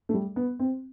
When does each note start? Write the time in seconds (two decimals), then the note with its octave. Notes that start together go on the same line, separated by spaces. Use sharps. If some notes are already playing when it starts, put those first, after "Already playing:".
0.09 A3
0.14 G3
0.36 B3
0.59 C4